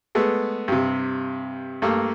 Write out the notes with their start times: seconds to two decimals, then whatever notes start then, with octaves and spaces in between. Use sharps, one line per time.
0.15 G#3 A3 B3
0.68 G2 C3
1.82 G2 A3 A#3